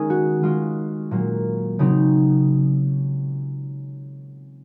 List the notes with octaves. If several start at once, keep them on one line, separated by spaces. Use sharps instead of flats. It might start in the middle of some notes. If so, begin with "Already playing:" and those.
Already playing: D#3 G#3 C#4 D#4 G#4
F#4
D#3 G#3 C#4 F4
A#2 F#3 A#3
C#3 F#3 C4 D#4